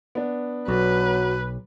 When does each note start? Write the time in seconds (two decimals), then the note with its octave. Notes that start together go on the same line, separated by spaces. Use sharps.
0.15 B3 D4
0.68 B1 F#3 B4